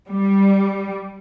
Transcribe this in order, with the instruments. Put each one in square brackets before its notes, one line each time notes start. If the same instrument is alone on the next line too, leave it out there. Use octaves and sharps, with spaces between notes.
[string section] G3